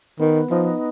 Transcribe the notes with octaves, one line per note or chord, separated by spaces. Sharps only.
D#3 B3
F3 D#4